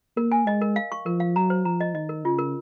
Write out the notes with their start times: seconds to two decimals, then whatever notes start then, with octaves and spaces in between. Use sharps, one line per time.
0.17 A#3 A#4
0.32 G#5
0.46 G#3 D#5
0.61 A#4
0.76 F5
0.92 C#6
1.06 F3 A#4
1.20 F5
1.36 F#3 A#5
1.50 C5
1.65 F3 A#5
1.81 D#5
1.94 D#3 D#5
2.09 A#4
2.24 C#3 F4
2.39 A#4